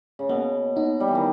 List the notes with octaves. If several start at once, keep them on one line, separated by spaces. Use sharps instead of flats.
C#3
B2 A#3
B2 D#4
G3
E3
D#3